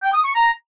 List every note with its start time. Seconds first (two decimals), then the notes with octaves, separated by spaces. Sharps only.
0.03 G5
0.13 D#6
0.24 C#6
0.34 A#5